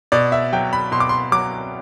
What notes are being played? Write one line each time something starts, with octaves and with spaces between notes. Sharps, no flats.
B2 D5
E5
F#3 G5
B5
B2 C6
D6
C6
F#3 D6